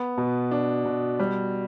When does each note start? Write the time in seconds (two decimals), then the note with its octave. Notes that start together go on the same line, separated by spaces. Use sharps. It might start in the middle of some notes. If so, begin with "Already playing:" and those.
Already playing: B3
0.18 B2
0.51 D4
0.85 B2
1.19 G3